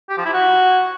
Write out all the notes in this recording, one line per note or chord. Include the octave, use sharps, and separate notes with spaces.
G4
F3
E4
F#4